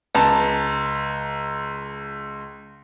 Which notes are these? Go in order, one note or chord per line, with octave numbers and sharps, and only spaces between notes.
C#2 A5 A#5